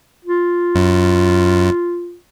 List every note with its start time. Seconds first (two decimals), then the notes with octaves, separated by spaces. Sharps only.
0.25 F4
0.75 F#2